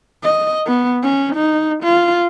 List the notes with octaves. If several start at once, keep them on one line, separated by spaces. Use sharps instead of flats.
D#5
B3
C#4
D#4
F4